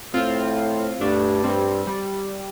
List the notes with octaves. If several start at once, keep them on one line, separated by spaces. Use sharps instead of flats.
A2 C4 F4
G2 A3 D4
G2 G3 C4
G3